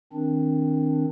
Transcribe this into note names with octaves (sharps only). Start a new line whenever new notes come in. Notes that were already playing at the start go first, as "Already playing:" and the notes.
D#3 C4 D4